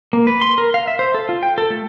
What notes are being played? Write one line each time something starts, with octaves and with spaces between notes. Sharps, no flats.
A#3
B4
C6
A#4
F5
E5
C5
A4
F4
G5
A4
A3